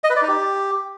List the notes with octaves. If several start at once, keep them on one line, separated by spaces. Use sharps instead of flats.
D#5
B4
D5
D#4
G4